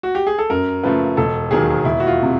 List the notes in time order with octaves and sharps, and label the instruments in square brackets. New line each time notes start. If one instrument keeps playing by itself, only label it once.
[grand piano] F#4
G4
G#4
A4
F#2 A#4
C#3 F3 A3 B4
E1 A4
D#2 D#3 F#3 A#3 G#4
E1 E4
F#4
F4
C3